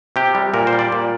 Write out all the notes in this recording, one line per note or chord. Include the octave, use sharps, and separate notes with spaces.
C3 G4
G3
A#2 A#4
C5
G3
D5
A#2